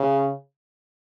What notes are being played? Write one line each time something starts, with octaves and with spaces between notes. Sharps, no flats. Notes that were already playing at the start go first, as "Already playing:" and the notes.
Already playing: C#3